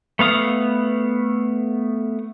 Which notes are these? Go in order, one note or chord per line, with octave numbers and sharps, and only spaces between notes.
A3 B3 F5 D#6